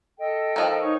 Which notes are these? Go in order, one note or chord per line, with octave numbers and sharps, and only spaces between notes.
A4 D#5 G5
D#3 F3
D#4 C#5 C#6